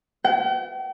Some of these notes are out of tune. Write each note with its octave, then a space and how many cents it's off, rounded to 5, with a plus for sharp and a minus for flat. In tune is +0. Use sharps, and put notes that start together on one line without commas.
G5 -45